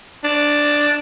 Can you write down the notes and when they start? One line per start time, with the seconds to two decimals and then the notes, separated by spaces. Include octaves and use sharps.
0.24 D4